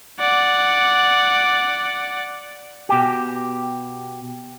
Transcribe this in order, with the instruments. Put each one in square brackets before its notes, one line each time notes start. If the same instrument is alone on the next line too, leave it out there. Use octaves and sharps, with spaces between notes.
[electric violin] D5 F#5
[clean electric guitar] B2 G4